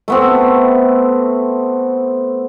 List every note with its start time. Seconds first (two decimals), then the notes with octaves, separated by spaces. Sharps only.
0.08 A3 B3 C4